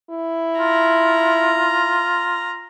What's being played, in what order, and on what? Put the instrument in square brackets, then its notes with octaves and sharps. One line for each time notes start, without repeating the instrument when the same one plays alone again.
[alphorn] E4
[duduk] F4 [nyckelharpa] A#5